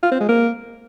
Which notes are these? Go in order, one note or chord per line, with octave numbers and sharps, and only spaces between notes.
F4
C4
G#3
A#3